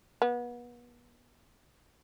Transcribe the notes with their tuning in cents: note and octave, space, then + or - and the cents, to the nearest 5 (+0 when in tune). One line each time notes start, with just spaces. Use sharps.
B3 -35